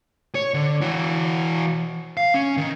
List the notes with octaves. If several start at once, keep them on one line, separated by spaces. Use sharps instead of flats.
C#5
D3
E3 F#4
F5
C#4
D#3